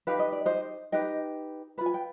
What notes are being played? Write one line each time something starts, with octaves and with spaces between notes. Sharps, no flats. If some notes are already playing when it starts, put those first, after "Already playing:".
D#4 G4 B4 F5
D#5
D5
C5 D#5
D#4 G4 B4 D#5 G5
F4 B4 B5
G#5
G5